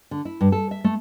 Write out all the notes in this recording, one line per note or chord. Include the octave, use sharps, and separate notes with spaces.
D3
E4
G2
A4
E5
A3